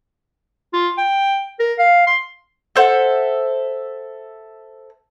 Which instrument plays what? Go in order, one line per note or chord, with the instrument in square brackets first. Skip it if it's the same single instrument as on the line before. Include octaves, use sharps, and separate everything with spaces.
[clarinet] F4
G5
A#4
F5
C6
[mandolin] A4 C5 E5 F#5